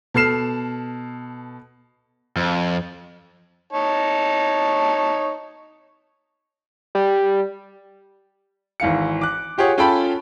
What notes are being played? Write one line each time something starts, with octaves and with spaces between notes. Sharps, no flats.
B2 A4 F6 C7 E7
F2
D#4 C#5 A5
G3
G#1 E3 F5 C#7
D6 F#6
F4 G4 G#4 C#5 F#5
C#4 F4 A4 G5 A5 B5